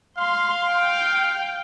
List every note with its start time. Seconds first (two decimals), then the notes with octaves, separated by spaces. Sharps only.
0.18 F5 C6
0.71 G5